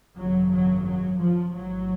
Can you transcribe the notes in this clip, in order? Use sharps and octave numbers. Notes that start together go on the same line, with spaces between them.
G#1 F#2 C#3 F#3
F#3
F#3
F3
A1 G#2 F#3